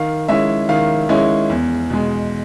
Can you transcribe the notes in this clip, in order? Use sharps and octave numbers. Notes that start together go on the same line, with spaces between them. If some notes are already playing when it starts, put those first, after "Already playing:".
Already playing: D#3 F5
G#3 C#4 E4 E5
D#3 F5
G#3 C#4 E4
E2
B2 G#3